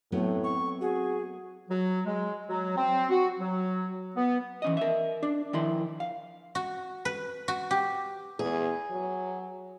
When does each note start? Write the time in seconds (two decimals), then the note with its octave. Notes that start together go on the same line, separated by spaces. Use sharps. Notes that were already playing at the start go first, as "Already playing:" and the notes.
0.12 A2 F#3 A3 B3 C4
0.44 C#6
0.81 F#4 G#4
1.69 F#3
2.06 G#3
2.47 F#3
2.76 C4
3.10 F#4
3.39 F#3
4.16 B3
4.62 E3 C#4 D#5
4.77 A#4 E5
5.23 D4
5.53 D#3 F3 E4 A#4 C6
6.00 F5
6.55 F#4
7.05 B4
7.48 F#4
7.71 G4
8.39 E2 G#4
8.91 F#3